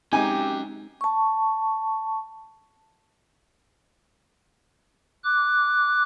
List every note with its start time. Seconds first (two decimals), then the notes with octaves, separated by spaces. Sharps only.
0.13 G#3 C4 C#4 D#4 G4 G#5 A#5
1.01 A5 C#6
5.24 D6 F#6